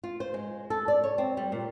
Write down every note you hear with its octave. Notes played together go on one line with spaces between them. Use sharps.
F4
C5
G#3
A4
D5
C#5
C4
G3
A#2